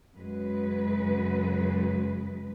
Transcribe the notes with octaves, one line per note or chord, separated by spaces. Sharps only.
F#2 C#3 G#3 B4